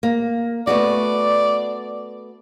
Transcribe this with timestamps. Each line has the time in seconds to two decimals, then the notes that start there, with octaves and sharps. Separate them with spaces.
0.03 A#3
0.67 A3 B3 F#4 D5